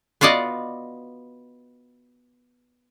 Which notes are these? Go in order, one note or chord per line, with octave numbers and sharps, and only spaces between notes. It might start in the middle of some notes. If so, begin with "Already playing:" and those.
B3 F4 F#4 D5 D#5